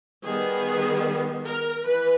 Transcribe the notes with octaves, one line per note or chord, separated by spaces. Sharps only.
D#3 G3 B3 G#4
A#4
E3 B4